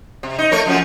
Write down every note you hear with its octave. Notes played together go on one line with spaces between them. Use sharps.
C3
D#4
A3 A#4 C#5
F#2 F3 C#4